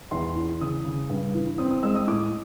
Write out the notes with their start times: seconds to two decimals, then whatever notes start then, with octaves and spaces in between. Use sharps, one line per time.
0.11 E2 C6
0.36 E3
0.61 C#3 D#6
0.85 C#3
1.10 G2
1.34 E3
1.58 C4 D#6
1.71 D#6
1.83 G#3 E6
1.95 D#6
2.07 A2 D6